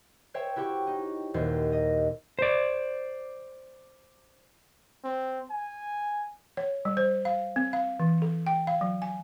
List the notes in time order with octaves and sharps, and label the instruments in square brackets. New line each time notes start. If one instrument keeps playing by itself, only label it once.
[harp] C5 C#5 E5 G5
E4 F#4 G4 G5 C#6
D#4
D#1 D#2 C5
D#5
[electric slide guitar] C5 D5
[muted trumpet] C4
G#5
[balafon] C#5
G3
C5
F5
C4
F5
E3
A4
G5
F5
F#3
G#5